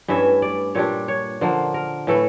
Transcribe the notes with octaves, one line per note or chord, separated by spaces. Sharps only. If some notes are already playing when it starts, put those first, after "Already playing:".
G2 E3 A3 C#4 E5
D5
A#2 G3 D4 C#5
C#5
D3 F3 A#3
A#4
A2 E3 A3 A4